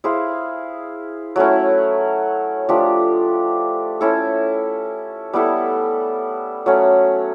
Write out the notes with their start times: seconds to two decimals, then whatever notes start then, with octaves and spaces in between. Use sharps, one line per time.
0.04 E4 G#4 C5 F5
1.36 F#3 A3 C#4 E4
2.69 F3 A3 D4 G4
4.01 C#4 E4 A4
5.33 G3 B3 E4 A4
6.66 F#3 A3 C#4